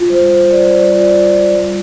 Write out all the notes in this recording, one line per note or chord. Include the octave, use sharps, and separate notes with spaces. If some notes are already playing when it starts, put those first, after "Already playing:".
Already playing: F4
G3 C5
G3 C5
G3 D5
G3 D5
C5
F4
D5
F4
F4
G3